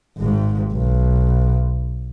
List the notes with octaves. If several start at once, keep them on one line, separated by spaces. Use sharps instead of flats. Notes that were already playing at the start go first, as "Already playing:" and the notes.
G#1 G#2
B1